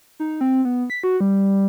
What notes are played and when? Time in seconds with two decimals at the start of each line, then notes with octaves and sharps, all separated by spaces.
0.20 D#4
0.41 C4
0.65 B3
0.90 B6
1.04 F#4
1.20 G3